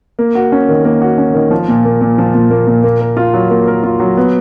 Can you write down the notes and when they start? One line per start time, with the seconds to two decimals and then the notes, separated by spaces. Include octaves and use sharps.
0.19 A#3
0.35 F#4
0.52 C#4
0.69 D#3
0.85 A#3
1.02 F#4
1.18 C#4
1.34 D#3
1.51 F3
1.68 A#2
1.85 A#3
2.01 A#2
2.18 F3
2.35 A#2
2.50 A#3
2.67 A#2
2.83 A#3
3.01 A#4
3.17 F4
3.34 F#3
3.50 A#3
3.68 A#4
3.84 F4
4.00 F#3
4.17 B3